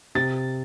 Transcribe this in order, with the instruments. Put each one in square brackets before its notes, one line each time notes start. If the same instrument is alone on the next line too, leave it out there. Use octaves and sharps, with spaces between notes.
[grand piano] C3 A6